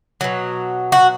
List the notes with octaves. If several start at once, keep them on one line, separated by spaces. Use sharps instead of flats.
B2 F#3
F#4